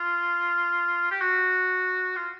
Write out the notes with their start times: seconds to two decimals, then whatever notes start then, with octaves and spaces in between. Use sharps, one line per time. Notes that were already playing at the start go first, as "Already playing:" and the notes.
Already playing: F4
1.11 G4
1.21 F#4
2.16 F4